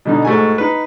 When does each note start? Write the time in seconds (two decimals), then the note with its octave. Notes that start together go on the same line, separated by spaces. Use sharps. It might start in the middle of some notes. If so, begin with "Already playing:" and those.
0.05 B2 D3 D#4
0.25 G#2 A3 F#4 G#5
0.58 D#4 B4